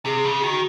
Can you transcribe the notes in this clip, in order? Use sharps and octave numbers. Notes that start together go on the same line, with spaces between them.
C3 G#4
C#3
D#3 F#4